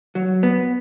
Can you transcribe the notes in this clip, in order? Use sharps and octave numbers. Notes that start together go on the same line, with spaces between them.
F#3
B3